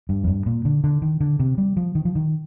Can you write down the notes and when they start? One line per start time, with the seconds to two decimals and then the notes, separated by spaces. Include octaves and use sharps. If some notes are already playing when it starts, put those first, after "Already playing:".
0.09 G2
0.24 F2
0.28 G2
0.46 A#2
0.65 D3
0.84 D3
1.02 D#3
1.21 D3
1.40 C3
1.58 G3
1.77 F3
1.95 D#3
2.05 F3
2.15 D#3